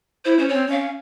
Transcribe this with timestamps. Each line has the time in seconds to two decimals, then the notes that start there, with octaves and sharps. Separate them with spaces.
0.25 E4 C5
0.38 C#4 C5
0.49 C4 C#5
0.68 C#4 F5